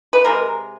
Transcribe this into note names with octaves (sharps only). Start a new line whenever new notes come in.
B4
C3 F3 G#3 A#4